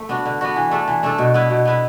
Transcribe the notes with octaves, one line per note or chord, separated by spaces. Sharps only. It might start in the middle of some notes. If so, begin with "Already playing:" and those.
Already playing: A3
B3 D4 F#4
D3
B3 D4 F#4
E3
A3 D4 A4
E3
A3 D4 A4
B2
B3 E4 B4
B2
B3 E4 B4